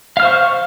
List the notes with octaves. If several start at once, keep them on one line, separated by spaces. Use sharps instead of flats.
C5 F5 C#6 F6